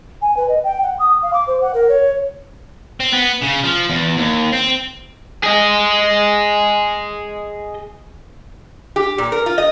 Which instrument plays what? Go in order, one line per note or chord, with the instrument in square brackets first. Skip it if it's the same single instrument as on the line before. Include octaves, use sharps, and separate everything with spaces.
[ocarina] G#5
B4
D#5
G5
F#5
D#6
F5
D6
C5
F#5
A#4
C#5
[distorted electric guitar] C4
B3
C#3
F3
E2
D#2
C4
[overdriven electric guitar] G#4 D#5
[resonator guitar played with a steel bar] G4
A#2
A#4
F4
D#5